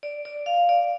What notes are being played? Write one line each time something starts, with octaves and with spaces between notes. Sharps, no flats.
D5
D5
F5
D5